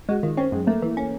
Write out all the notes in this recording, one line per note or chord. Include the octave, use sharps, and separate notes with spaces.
G#3 F#4
D#3 F4
C4 C#4
F#2 G#3
A3 A#3
E3
C#4